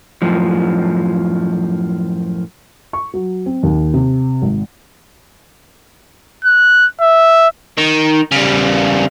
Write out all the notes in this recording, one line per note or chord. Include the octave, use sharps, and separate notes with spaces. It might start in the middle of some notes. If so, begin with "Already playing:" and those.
F#2 A2 F3
C#6
F#3
C4
D#2
C3
G#1
F#6
E5
D#3
C#3 G3